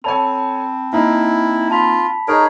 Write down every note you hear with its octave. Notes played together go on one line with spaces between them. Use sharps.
C4 A4 C#5 G#5 A5 B5
A#3 D#4 E4
F4 A5 B5 B6
D#4 G#4 A#4 C#5